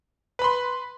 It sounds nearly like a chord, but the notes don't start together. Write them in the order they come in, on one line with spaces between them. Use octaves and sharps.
B4 B5 C6